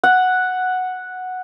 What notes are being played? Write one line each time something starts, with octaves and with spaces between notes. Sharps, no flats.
F#5